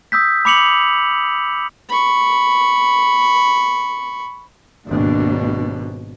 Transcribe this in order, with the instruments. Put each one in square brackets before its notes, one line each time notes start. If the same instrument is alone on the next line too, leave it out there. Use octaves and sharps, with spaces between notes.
[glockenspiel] D#6 E6 G6 B6
B5 D6 C#7 F7 F#7
[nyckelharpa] B5 C#6
[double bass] G#1 B2 [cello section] D#2 D4